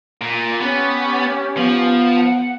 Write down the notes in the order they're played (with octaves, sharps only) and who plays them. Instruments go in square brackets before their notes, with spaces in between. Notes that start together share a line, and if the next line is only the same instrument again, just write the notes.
[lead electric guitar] A#2
[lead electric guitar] B3 [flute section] C#4 G4
[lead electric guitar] F3 [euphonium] B3
[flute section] F#5